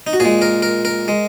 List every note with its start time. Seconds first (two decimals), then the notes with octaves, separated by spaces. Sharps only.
0.07 D#4
0.13 F#4
0.20 A#2 G#3 G#4
0.42 A#4
0.62 A#4
0.85 A#4
1.08 G#3